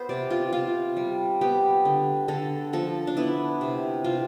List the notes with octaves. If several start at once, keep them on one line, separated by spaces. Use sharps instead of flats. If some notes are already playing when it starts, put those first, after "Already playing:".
Already playing: B3 C5 E5
C3 D5
F4
C3 F4
G3
B3 G4
D3
D3 A4
F3 A4
D4
B3 E4
C3
C3 F4